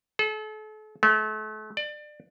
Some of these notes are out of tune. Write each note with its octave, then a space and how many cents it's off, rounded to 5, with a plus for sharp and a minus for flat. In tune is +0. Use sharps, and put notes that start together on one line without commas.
A4 -40
A3 -35
D5 +25